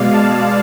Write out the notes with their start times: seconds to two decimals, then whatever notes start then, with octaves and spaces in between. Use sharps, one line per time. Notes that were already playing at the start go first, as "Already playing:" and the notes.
Already playing: B2 G#3 D5 F5
0.12 F5 A5